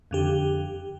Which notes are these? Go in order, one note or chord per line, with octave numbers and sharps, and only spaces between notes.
F2 D3 G4